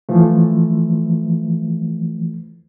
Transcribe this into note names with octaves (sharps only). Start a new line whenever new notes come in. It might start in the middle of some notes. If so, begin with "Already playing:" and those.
E3 F3 A3